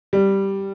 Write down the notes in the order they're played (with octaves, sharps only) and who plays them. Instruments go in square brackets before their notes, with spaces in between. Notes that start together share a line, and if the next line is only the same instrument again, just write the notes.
[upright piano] G3